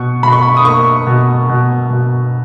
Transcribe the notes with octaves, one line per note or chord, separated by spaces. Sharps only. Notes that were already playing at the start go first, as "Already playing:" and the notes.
Already playing: B2 C#6
B2 B5
C#6
B5
D#6
A#3 C#6
B2
B2
B2